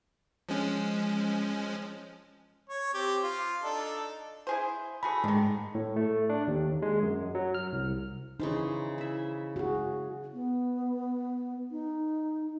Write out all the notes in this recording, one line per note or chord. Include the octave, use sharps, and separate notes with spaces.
F3 G#3 C#4
C#5
C4 G4
F4
D4 D#4 A4
E4 G#4 C5
A3 F#4 G#4 B5
G#2 D3 D#3 G#3
A2
A3
D4
D#2
G#3
F#2
F#3
F6
C2
C#3 E3 D#4 C5
E4 E5
F#4 G#4
B3
D#4